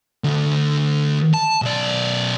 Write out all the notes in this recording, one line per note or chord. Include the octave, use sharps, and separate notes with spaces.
D2
A5
B1 D5